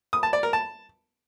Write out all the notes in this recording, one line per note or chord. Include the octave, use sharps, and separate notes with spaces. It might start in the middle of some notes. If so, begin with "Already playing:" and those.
D#6
A5
D5
A#4
A5